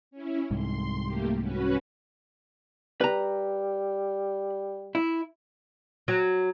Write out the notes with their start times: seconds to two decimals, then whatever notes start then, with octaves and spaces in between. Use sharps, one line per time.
0.11 C#4 E4
0.51 C2 G#2 C6
1.05 A3 A#3 G4
1.40 C#4 F#4 B4
3.01 G3 B4 A#5
4.95 E4
6.08 F#3